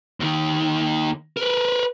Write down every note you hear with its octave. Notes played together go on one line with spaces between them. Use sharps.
D#2 D#3
A#4 B4